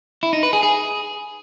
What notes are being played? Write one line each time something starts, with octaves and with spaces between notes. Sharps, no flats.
E4
D#4
B4
G#4
G#4